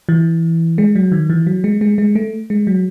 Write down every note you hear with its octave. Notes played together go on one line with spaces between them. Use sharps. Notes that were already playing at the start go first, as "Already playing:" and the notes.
E3
G#3
F#3
D#3
E3
F#3
G#3
G#3
G#3
A3
G#3
F#3